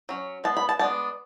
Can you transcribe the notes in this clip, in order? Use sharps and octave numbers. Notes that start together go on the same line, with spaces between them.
F#3 C#4
G#3 B3 A5
B5
A5
G#3 B3 D4 A5